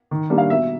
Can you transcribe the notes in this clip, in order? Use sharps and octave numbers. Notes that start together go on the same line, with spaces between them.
D#3
G3 A#3 D4
F5
B2 E5